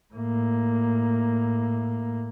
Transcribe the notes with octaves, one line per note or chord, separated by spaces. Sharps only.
A2 A#3